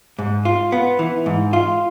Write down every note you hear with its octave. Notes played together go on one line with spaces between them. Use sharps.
G#2
F4
B3
E3
G#2
F4